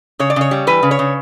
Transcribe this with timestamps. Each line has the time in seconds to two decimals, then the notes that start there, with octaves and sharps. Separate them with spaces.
0.19 C#3 C#5
0.30 D5
0.36 C#3 C#5
0.51 G3
0.67 E3 B4
0.83 C#3
0.91 C#5
0.99 C#3